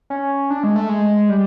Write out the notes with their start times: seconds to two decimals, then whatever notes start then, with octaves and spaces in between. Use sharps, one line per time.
0.10 C#4
0.50 D4
0.63 G#3
0.76 A3
0.89 G#3
1.29 G3